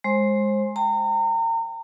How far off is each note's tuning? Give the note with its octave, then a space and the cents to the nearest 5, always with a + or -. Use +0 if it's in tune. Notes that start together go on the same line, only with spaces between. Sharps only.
G#3 -5 C5 +30 C6 +15
G5 +0 A#5 -35